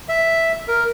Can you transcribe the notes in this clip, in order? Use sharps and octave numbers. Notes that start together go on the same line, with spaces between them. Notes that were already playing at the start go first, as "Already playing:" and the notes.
E5
A#4